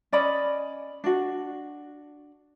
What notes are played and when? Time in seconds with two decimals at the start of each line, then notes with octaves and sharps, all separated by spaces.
0.12 C#4 D5 D#5 B5
1.04 D4 F#4